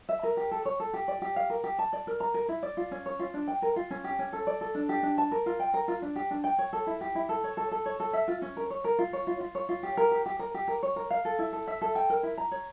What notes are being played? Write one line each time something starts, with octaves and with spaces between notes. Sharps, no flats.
E5
A#4
G4
A4
C#5
A4
G4
D5
G4
F5
A#4
G4
A5
D5
A#4
A#5
A#4
E4
D5
F4
C#4
C#5
F4
D4
G5
A#4
F4
C#4
G4
C#4
A4
D5
A4
D4
G4
D4
A5
A#4
F4
G5
A#4
F4
D4
G4
D4
G5
C#5
A4
E4
G4
E4
A4
C#5
A4
A4
C#5
A4
E5
F4
C#4
A#4
C#5
A#4
F4
C#5
F4
F4
C#5
F4
G4
A#4
G4
G4
A#4
G4
A#4
C#5
A#4
F5
A4
E4
A4
E5
A4
G5
A#4
E4
A#5
C#5